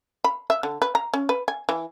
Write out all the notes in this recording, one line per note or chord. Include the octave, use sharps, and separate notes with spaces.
B5
E5
D3
B4
A#5
C#4
B4
G#5
E3